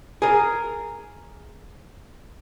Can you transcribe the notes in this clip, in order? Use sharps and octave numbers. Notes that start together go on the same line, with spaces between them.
G#4 A#4